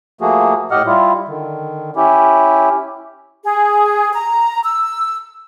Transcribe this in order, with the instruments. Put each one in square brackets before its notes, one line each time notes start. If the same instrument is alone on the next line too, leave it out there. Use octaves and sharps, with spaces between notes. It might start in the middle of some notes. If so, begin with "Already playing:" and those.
[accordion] F3 A3 A#3 F#4 G#4
A2 G4 D#5 F#5 F6
G3 E4 F4
D3 D#3
C#4 E4 G4
[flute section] G#4
A#5
E6